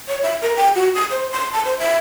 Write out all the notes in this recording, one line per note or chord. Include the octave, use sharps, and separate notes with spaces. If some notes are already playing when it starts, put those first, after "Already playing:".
C#5
E5
A#4
G5
F#4
D#6
C5
C6
A5
C5
E5